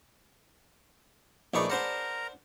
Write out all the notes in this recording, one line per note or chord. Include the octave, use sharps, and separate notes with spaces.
A#1 A3 D#4 G#4 B4 D5 C#6 D6
D4 A#4 C5 F#5 A#5